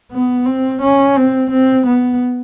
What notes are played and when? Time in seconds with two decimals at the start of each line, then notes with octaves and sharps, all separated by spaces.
0.12 B3
0.46 C4
0.82 C#4
1.17 C4
1.51 C4
1.86 B3